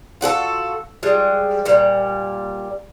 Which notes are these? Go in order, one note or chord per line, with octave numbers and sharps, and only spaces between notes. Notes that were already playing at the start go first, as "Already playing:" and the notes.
F4 F#4 G#4 A4
F3 G3 G#3
A#2 G3